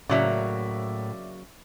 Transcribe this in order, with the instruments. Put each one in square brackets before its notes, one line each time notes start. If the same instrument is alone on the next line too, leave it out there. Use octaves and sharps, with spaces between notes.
[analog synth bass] A2 [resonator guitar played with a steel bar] C#3 F#3 A#3 [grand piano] D5 E5